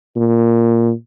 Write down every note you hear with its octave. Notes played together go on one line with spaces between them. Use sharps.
A#2